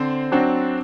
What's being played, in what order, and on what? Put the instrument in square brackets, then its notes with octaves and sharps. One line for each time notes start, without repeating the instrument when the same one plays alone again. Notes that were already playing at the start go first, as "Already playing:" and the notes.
Already playing: [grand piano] D3 [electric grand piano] C4 C5
[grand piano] F#3 C4 F#4 [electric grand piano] D4